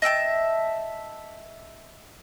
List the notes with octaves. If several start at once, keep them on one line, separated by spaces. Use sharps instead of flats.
D#5 E5 G5 A5